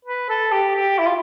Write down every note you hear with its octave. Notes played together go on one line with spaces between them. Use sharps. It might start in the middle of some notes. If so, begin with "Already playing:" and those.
B4
A4
G4
G4
E4
F4